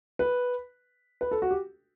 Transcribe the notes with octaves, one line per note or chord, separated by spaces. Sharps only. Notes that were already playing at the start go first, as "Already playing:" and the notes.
B4
B4
A4
F#4
G4